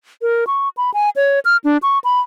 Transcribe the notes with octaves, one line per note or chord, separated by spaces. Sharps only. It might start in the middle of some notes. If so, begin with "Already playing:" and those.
A#4
C#6
B5
G#5
C#5
F6
D4
C#6
B5